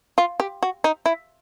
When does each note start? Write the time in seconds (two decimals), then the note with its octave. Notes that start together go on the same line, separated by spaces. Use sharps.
0.18 F4
0.40 G4
0.63 F#4
0.84 D#4
1.06 E4